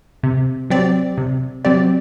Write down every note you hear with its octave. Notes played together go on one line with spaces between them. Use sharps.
C3
F#3 C4 G4 D5
C3
F#3 C4 G4 D5